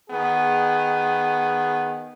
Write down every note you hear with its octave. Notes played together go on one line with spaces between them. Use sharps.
D#3 B3 G#4